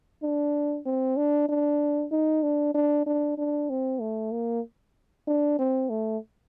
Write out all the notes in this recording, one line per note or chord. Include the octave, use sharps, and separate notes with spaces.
D4
C4
D4
D4
D#4
D4
D4
D4
D4
C4
A3
A#3
D4
C4
A3